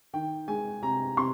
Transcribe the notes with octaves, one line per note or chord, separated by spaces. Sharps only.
D#3 G5
G#3 G#5
C3 A#5
C3 C6